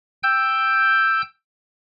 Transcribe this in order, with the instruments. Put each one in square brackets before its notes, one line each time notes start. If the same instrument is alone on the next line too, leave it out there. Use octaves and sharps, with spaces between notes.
[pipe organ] G5 E6 G6